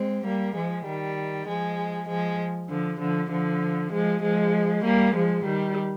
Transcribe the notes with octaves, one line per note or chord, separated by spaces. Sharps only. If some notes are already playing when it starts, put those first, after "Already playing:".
Already playing: G#3 C4
G3 A#3
F3 G#3
D#3 G3
F3 G#3
F3 G#3
D3 F3
D3 F3
D3 F3
F3 G#3
F3 G#3
G3 A#3
F3 G#3
D#3 G3